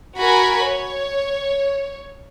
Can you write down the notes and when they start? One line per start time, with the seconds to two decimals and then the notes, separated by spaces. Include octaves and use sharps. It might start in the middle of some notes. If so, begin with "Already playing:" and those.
0.19 F#4 A#4 G#5 B5
0.63 C#5